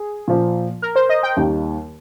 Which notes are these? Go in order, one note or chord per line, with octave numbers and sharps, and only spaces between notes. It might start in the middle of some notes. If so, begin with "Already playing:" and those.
Already playing: G#4
A#2 F3 A#3
A#4
C5
D#5
G5
D#2 D#3 G3 A#3